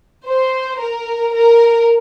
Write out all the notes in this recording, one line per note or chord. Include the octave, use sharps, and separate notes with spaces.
C5
A#4
A#4